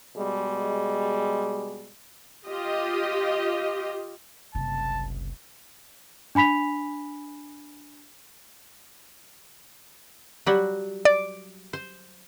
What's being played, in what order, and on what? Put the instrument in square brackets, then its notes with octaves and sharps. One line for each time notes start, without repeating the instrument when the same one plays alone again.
[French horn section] B2 G3 G#3
[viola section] F4 G4 D#5
[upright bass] F#1 C2 [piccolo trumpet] A5
[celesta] D4 G#5 B5 B6 F7
[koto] F#3 G3 F#4
[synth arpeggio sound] D5
[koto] C5